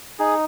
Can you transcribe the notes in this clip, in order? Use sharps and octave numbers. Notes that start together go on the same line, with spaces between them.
D#4 G#4